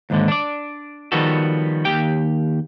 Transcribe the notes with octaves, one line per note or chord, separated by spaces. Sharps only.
D#2 G#2 D3
D4 D5
D#3 F3 G3 B3 F#4 A4
D#2 G4 G5